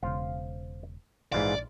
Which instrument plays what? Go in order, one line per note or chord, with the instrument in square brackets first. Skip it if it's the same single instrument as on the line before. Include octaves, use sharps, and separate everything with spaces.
[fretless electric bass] E1 C#3 [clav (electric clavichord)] C5 F5
[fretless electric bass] A#1 [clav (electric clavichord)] G#2 E3 F4 [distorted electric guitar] D5